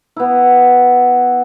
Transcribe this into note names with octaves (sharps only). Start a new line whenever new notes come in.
B3 E4